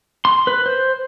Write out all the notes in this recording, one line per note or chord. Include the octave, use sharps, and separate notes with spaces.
C6
B4
C5